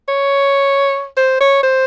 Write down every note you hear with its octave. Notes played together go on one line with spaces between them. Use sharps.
C#5
C5
C#5
C5